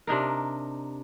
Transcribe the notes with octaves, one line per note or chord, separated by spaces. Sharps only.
C3 D4 D#4 A#4